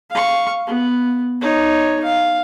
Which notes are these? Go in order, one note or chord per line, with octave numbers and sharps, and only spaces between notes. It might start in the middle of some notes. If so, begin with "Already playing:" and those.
F5 C#6
B3
D#4 C#5
F5